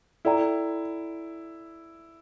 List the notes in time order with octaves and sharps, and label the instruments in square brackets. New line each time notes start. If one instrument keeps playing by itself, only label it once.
[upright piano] E4 [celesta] A4 D5 G5 A#5